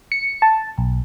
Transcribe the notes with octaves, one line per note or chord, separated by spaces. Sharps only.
C#7
A5
B1